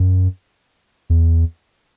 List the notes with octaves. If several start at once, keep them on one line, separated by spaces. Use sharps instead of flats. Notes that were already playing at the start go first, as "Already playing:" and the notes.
Already playing: F#2
E2